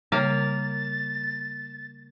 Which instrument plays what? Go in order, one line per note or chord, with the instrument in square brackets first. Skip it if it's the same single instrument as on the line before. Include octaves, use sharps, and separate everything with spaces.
[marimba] C#3 G3 [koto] A#3 F5 [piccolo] A6